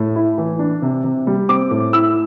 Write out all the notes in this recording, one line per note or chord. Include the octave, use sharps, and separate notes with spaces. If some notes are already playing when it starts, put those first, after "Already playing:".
Already playing: A2
E4
E3
D4
C3
C3
G3
C4 D6
A2
E4 E6